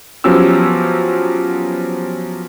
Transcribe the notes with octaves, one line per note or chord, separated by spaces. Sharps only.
F3 F#3 B3 C#4 G4 E6